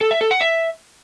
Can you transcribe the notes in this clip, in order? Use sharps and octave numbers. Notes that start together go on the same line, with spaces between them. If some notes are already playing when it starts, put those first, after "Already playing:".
A4
E5
A4
F#5
E5